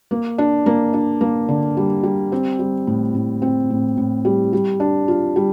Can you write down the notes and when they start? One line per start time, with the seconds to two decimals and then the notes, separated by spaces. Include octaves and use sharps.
0.11 A#3
0.38 D4
0.66 A#3
0.94 D4
1.21 A#3
1.49 D3
1.77 G3
2.03 G3
2.32 C4
2.59 G3
2.87 A2
3.15 A2
3.42 C4
3.70 A2
3.97 A2
4.25 G3
4.53 G3
4.80 D4
5.08 F4
5.36 G3